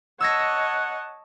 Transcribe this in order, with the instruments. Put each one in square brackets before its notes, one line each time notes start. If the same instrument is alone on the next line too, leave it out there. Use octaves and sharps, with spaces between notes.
[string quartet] C#5 D#5 A5 [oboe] F#5 [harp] E6 G#6 A#6